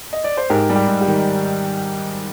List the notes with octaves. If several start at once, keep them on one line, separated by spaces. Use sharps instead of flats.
D#5
D5
C5
G#2 G4 A#4
G3
G4
G#2
G4
D#3